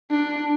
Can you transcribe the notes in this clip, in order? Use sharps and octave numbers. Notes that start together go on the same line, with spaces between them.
D4